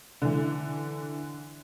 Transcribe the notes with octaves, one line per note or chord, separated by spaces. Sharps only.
D3 E3